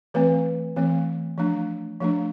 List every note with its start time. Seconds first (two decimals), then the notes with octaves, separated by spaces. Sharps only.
0.14 E3 A3 C4 B4
0.76 E3 A3 C4
1.38 F3 A3 D4
2.00 F3 A3 D4